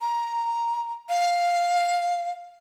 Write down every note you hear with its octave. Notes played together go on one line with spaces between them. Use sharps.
A#5
F5